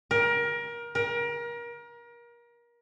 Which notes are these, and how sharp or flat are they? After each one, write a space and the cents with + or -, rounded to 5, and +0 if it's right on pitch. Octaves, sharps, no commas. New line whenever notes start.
A#4 +25
A#4 +30